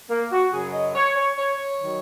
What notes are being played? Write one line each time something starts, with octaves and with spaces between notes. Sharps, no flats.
A#3
F#4
F#2 C#3 F#3 G#4
D#5
C#5
C#5
C#5
C#5
D#3 F#3